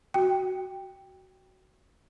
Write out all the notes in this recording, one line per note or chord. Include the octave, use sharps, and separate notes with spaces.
F#4 G5